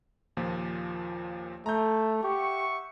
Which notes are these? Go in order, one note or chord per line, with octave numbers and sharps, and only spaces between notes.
D#2 A#2 F3
A3 A#5 G6
G4 E5 F#5 C#6